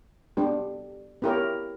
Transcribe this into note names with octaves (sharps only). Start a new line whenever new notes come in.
G3 B3 D4 G4
B3 E4 G4 A#4 C#5